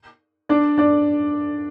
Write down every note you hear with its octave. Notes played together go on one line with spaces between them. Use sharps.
D4 D5
D4 D5